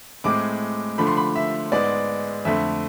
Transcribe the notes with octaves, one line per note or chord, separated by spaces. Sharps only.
A2 G#3 C4 D6
D3 F3 A3 D4 B5
C6
B5
E5
G#2 G#3 B3 D5
F2 D3 A3 E5